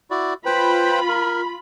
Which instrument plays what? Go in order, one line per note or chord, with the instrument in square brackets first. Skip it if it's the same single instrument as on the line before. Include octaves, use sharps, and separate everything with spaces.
[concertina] E4 F#4 D5
[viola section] F4 B5 [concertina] B4 C5 G5
[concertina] A#4